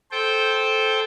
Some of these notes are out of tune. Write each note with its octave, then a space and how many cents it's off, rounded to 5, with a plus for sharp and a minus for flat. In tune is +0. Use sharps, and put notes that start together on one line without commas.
A4 -15 C5 +0 G5 +0